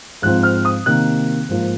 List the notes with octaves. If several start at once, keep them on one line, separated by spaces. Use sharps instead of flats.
G#2 F3 C4 F#6
F6
D#6
C3 D#3 A#3 F#6
G#2 F3 A#3